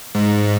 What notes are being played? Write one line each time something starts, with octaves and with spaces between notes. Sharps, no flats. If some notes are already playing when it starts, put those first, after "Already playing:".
G#2